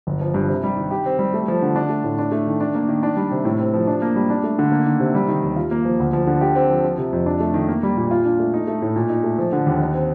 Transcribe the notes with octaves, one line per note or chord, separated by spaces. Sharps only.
G1
F3
G2
C3
G3
D#3
G4
C4
G3
A3
F3
D3
D4
A3
A2
D4
A3
D#3
D4
A#3
D#3
D4
G3
C3
A2
C4
F3
D4
A#3
G3
D4
A3
D3
A#3
D#3
C3
G3
D#3
D#2
F4
A#3
F3
D2
F3
D3
G4
C4
F3
F3
C3
F2
D4
A3
D#3
A#3
G3
A#2
F4
D4
A3
D#4
A3
A2
A#2
D#4
A3
F3
D3
D#2
D#4
C4